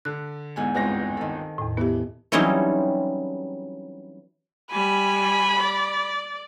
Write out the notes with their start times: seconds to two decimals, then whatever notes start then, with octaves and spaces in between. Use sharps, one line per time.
0.05 D3 F#6
0.56 E2 G#2 G#5
0.74 G1 C#2 G#3 C4 A#6
1.17 D#3 A4
1.58 E2 A2
1.77 E3 B3 G4
2.32 E3 F#3 G3 C4 C#4 D#4
4.72 G3 G#5 B5
5.60 D5